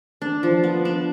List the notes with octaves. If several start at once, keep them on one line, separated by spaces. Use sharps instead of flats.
D4
F3
B3
D4